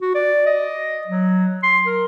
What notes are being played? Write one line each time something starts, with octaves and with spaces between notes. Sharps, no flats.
F#4
D5
D#5
F#3
C6
A#4